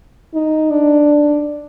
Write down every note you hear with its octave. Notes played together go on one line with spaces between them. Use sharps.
D#4
D4